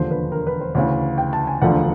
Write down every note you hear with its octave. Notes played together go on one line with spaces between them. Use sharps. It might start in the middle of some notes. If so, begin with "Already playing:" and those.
Already playing: E1 D#2 D3 F3 C5
B4
A#4
B4
C5
D2 C#3 E3 C#5
G5
A5
G#5
E1 D2 D3 F3 F#5